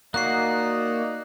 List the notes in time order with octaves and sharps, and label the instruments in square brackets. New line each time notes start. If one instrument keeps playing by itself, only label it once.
[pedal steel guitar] A#3 F#4 [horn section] D#4 D5 D#5 [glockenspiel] F#6 C7